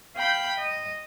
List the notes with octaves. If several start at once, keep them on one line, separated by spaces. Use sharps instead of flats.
F5 G5 B5 G6
D#5